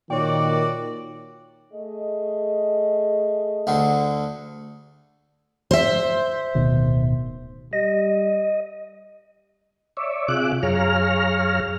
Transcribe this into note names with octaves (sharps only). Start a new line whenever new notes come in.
A#2 D#3 F#4 C#5 D5 G5
A3 G#4 D#5
D2 D3
C5 E5
D1 B2 D#3
G3 D#5
C#5 D5 E5
C3 F4 G#4 E5 D6 F#6
F#2 G#4 C#5 F5 A#5 F6